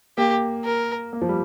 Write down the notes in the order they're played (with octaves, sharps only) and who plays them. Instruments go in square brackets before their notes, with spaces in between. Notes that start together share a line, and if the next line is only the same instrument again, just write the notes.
[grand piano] A#3 [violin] G4
[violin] A#4
[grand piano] A#3
F3
G3